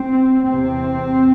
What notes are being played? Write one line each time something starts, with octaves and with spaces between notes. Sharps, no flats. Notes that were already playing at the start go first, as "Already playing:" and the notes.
Already playing: C4
E2 C3 C4